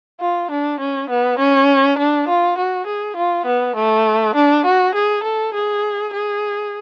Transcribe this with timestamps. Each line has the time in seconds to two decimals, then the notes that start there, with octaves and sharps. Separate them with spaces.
0.20 F4
0.51 D4
0.80 C#4
1.10 B3
1.39 C#4
1.98 D4
2.29 F4
2.58 F#4
2.87 G#4
3.17 F4
3.46 B3
3.76 A3
4.35 D4
4.65 F#4
4.95 G#4
5.23 A4
5.54 G#4
6.13 G#4